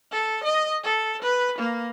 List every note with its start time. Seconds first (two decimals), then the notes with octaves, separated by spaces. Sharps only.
0.12 A4
0.43 D#5
0.83 A4
1.22 B4
1.58 A#3